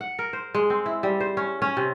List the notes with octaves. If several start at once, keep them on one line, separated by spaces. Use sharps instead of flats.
F#5
A#4
C5
G#3
C4
E4
G3
C5
C#4
C#4
C3